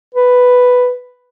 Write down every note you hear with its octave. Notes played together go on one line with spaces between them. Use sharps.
B4